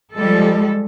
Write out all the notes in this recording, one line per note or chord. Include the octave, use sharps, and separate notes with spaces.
F3 G3 G#3 A4